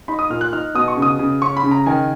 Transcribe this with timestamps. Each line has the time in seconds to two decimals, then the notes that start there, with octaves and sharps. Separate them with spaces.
0.08 D#4 B5
0.19 D#6
0.30 A#2 F6
0.41 F#6
0.52 D#4 F6
0.75 B2 D#6
0.88 C#6
0.97 C#3
1.02 D#6
1.19 C#3
1.42 C#4 C#6
1.57 B5
1.63 C#3
1.71 A#5
1.86 D#3 G#5